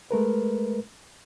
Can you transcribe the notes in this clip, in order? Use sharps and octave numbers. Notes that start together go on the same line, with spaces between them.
G#3 A3 A#4 B4